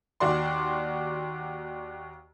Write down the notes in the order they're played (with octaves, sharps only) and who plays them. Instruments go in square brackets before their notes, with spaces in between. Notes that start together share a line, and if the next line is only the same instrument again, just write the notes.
[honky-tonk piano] D#2 F#4 D5 C6